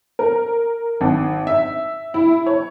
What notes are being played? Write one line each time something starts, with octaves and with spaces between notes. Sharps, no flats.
A#4
G#1
E5
E4
C#5